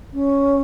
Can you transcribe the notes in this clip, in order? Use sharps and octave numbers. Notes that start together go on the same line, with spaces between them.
C#4